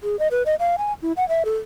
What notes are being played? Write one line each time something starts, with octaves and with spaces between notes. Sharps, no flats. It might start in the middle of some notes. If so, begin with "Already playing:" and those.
G#4
D#5
B4
D#5
F5
G#5
E4
F#5
E5
A4